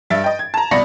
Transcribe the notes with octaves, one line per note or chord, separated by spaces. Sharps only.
G2 E5 A6 D7
D#5 G5
G#6
A5 A#5
C2 B2 D5 B5 A#6 C#7